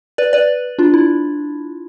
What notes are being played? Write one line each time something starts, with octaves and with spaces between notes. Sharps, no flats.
B4 D5
B4 D5
D4 F4
E4